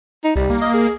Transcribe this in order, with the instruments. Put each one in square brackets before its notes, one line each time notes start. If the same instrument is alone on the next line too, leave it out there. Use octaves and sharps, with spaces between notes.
[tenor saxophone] D#4
[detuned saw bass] C2 [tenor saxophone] G3
[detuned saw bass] A#3
[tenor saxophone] D#5
G#4